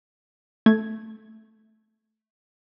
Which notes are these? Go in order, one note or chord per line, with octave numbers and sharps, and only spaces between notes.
A3 G#6